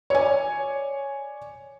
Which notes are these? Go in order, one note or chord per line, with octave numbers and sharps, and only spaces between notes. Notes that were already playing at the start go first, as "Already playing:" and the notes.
C#5 D5 G#5